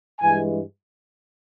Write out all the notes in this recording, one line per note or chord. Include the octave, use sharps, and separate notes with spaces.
G2 E3 G#3 G#5